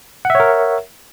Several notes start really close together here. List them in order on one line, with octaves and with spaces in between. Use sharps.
F#5 E5 C#5 A#4